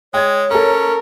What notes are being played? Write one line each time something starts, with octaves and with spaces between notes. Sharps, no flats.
G#3 C#5 G5 G#6
C#4 A4 A#4 A#5